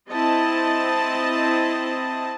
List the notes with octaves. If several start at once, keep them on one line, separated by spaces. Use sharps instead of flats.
C4 E4 D#5 A5